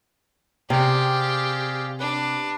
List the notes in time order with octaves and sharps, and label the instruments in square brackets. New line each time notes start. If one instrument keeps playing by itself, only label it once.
[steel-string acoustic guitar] C3 [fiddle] G4 [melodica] G#4 D5 F5
[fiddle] D4 [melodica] B4